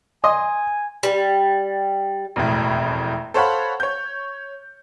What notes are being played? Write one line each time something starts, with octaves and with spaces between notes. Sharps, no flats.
D#5 G#5 C6 D#6
G3
E1 F2 A2
A4 C5 C#5 F5 F#5 B5
C#5 G6